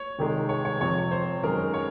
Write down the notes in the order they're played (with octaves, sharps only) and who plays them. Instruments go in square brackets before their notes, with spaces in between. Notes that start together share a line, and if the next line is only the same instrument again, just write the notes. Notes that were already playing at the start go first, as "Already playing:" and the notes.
Already playing: [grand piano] C#5
[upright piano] C2 C3 D#3 G#3
[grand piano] C#5
C#5
[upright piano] F2 C3 F3 [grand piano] C#5
[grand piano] C5
[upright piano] F#2 D#3 G#3 C#4 [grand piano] A#4
[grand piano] C#5